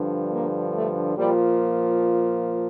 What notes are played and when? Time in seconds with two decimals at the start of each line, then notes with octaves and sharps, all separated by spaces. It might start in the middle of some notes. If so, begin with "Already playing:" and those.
Already playing: G2 D3 F3
0.32 A#3
0.75 A3
1.18 A#2 F3 G3